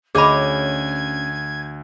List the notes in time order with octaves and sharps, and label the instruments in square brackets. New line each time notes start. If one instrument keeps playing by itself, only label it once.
[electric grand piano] D2 [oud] C#4 D#5 [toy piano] G#4 B5 [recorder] G#6